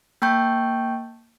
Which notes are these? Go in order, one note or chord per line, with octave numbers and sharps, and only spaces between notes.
A#3 G5 A5 C#6 G6